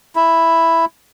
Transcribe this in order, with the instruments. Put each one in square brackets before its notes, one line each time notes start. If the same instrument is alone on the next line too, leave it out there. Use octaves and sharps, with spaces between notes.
[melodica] E4